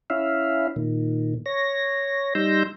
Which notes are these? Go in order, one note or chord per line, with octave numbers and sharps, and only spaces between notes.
C#4 E4 E5 F5
A#2 D#3
C#5 A#6
G3 D#4 C6 E6 G6 A#6